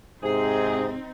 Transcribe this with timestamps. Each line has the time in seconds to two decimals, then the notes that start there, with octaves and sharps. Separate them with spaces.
0.23 G#2 C3 C4 D#4 G#4